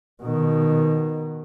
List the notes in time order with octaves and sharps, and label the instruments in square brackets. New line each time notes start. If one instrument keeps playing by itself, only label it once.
[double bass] B2 D#3